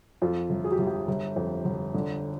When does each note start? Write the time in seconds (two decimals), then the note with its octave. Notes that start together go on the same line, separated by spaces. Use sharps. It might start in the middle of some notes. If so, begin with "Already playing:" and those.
0.22 F2 F4
0.50 G1
0.64 G#4
0.72 G4
0.79 G1 F4
0.87 G4
1.08 G1
1.36 F2
1.65 G1
1.94 D3